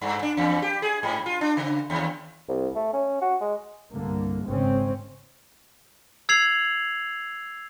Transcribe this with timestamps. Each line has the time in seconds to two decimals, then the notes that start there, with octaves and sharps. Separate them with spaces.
0.01 G2
0.22 D4
0.37 E2
0.62 G4
0.82 G#4
1.03 G#2
1.26 F4
1.41 D4
1.57 C#3
1.90 D#2
2.49 C2
2.75 A3
2.93 C#4
3.22 F#4
3.41 G#3
3.92 C2 G2 D3 A#3
4.45 G#1 C#3 G#3 C4 C#4
6.29 E6 G#6 C7 F7 F#7